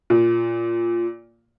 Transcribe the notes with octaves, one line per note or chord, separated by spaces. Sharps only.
A#2